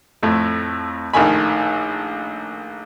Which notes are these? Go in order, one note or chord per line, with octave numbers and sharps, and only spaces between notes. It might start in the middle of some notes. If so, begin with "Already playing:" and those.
F2 A2 A3
A#1 A2 D#3 A3 G#5 B5